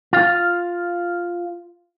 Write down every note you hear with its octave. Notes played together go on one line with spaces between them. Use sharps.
F4 F5